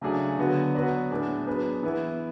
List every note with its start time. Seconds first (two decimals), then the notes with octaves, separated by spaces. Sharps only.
0.01 C#3 F#3 A3 D4 G#4
0.38 D3 F#3 B3 F#4
0.74 F#3 B3 F#4 B4 D5
1.10 A2 F#3 B3 D4 G#4
1.47 F#3 B3 D4 G#4 B4
1.83 E3 B3 E4